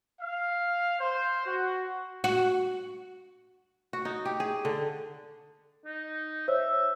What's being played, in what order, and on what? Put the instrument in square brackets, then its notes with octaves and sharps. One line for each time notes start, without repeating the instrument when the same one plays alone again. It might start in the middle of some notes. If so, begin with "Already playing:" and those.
[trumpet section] F5
C5
F#4
[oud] F#4
[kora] F#4
D#4
G4
G#4
D3
[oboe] D#4
[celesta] C5 C#5 [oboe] E5